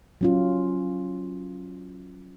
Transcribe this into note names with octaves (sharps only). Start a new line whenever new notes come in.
F#3 C#4 F4